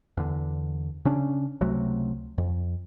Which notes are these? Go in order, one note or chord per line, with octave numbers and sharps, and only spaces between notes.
E2 D3
C#3 C#4 D4
C#2 C3 F#3 A3
F2